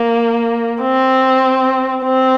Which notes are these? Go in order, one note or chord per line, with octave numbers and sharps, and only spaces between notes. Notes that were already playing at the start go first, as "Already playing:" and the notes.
Already playing: A#3
C4
C4